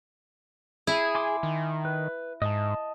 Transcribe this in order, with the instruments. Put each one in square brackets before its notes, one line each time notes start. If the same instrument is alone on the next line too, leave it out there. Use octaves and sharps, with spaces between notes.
[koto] E4 [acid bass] G#4
[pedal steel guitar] G#5 C6 D6
[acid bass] D#3
[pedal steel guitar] B4
[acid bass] G#2 [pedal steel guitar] D#5 A5